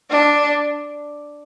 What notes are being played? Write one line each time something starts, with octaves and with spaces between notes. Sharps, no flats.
D4